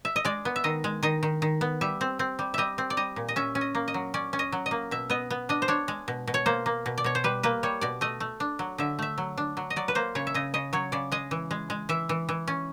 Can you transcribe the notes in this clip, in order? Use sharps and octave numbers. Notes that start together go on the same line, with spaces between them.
E5
D#5
G#3 D5
B3
E5
D#3 D#5
G#3
D#3 D#5
D#3
D#3
B3
G3 E5
C4
C4
G3
G3 D#5 E5
C4
D5
G3 D#5
A#2
D#5
C#4 E5
C#4
D#5
A#3
D#5
F#3
C#4 D5
C#4
D#5
F#3
D#5
A#3
B2 E5
B3 D#5
B3
D4 D#5
C5
D4 C#5
G#3
B2
B2
C#5
A#3 C5
A#3
B2
D5
B2 C#5
C5
G3 B4
A#3 B4
G3 C#5
B2 D5
A3 D#5
A3
D4
F#3
D3 E5
A3 E5
F#3
D4
F#3
D#5
F#3 D5
B4
A#3 C5
C#3 C#5
E5
C#3 D#5
C#3 D#5
F#3 C#5
C#3 D5
G#3 D#5
E3
G#3
G#3
E3 E5
E3
E3
C#4